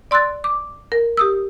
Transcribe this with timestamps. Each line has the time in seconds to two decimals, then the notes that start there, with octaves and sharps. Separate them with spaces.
0.11 D5 C6 E6 F#6 A6
0.44 D6
0.92 A#4
1.17 G4 D#6 E6